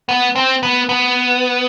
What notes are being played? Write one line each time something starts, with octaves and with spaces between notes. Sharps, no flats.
B3
C4
B3
B3